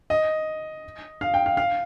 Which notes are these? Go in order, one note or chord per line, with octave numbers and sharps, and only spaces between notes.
D#5
F5
G5
F5
F5